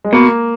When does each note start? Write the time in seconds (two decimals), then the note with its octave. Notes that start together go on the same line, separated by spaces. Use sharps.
0.04 G#3
0.12 B2 A#3